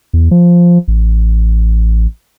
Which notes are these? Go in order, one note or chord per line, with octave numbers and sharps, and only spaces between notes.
E2
F3
A1